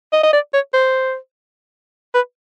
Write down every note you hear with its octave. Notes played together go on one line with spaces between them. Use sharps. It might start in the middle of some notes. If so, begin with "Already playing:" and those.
D#5
D#5
D5
C#5
C5
B4